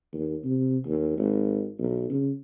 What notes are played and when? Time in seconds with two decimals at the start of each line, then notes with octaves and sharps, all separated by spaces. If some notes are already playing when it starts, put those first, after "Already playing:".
0.13 D#2
0.44 C3
0.86 D#2
1.18 G#1
1.79 B1
2.10 C#3